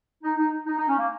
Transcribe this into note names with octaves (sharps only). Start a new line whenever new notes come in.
D#4
D#4
D#4
D#4
C#4
A#3